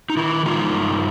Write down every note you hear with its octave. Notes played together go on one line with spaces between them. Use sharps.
D#4
D#3 E4
G#3 D#4 F4
G2